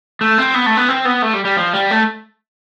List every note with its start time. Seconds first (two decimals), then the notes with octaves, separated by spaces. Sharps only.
0.21 A3
0.38 C4
0.54 B3
0.66 A3
0.77 B3
0.89 C4
1.05 B3
1.23 A3
1.34 G3
1.45 G3
1.57 F3
1.74 G3
1.91 A3